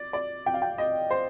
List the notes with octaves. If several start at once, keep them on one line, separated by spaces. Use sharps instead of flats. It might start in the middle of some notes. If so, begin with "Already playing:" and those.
Already playing: D5
D5
G5
F5
G5
D#5
C5